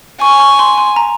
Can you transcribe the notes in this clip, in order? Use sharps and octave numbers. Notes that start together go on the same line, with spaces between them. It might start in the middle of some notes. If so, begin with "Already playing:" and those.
G#5 C#6
C#6
C6
C6
A#5